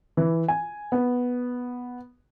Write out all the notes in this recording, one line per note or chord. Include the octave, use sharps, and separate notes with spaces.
E3
G#5
B3